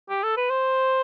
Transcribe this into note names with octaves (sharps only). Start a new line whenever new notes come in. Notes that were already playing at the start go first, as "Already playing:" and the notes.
G4
A4
B4
C5